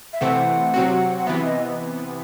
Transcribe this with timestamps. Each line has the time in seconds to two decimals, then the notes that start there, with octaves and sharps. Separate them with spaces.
0.13 E5
0.21 C3 E3 A3 C4 F#5
0.74 C3 F#3 C4 F#4
1.18 F#5
1.27 C3 E3 B3 E5
1.45 D#5